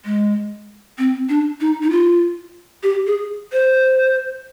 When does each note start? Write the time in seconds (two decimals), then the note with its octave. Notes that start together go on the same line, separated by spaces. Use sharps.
0.05 G#3
0.98 C4
1.29 D4
1.61 D#4
1.83 D#4
1.91 F4
2.83 G4
3.07 G#4
3.53 C5